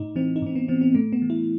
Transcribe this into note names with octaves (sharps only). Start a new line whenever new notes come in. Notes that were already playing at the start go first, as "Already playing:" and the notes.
Already playing: A2 D#4
E3 C4
D#4
A2 C4
B3
E3 C4
C4
A2 A3
B3
E3
E4